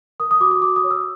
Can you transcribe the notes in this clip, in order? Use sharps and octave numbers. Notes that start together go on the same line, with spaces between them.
A#4 D#6
D#6
F#4 D6
D6
F#4 D6
D#6
C#5
E6